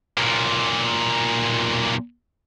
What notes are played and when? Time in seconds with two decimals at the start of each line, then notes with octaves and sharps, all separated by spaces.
0.17 B1 A#2